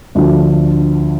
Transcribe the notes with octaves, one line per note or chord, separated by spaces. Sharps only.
D2 D3 F3 D4